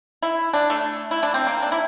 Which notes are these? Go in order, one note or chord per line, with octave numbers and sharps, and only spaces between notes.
E4
D4
A3
E4
D4
C4
A#3
D4
E4